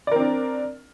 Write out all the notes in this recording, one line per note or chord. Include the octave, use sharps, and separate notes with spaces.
C4 D4 A#4 D5